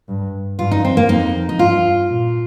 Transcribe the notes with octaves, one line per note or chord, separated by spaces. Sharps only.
G2
G2 F4
D#4
C4
A#3
F2 D#4
D#4
G2 F4
A#2